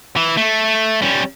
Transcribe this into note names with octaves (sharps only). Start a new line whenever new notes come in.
E3
A3
G3 C#4